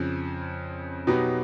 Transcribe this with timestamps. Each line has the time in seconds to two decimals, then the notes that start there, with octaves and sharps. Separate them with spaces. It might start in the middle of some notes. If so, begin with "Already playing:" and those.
Already playing: F2 C#3 F3
1.07 B2 F#3 B3 D#4 G4